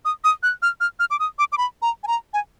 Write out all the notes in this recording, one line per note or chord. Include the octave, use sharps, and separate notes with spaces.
D#6
D#6
F#6
F6
F6
F6
D6
D#6
D6
D6
B5
A#5
G#5
A#5
G#5